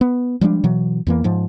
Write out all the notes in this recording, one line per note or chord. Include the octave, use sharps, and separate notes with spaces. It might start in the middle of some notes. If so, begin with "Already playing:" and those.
B3
F3 G3 G#3 D4
B2 E3 F#3
E2 E3 A#3
G#2 F3